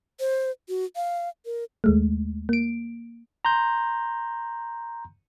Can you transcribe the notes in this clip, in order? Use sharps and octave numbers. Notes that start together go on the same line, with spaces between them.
C5
F#4
F5
A#4
D#2 G#3 A3
A#3 D7
A#5 C6 G6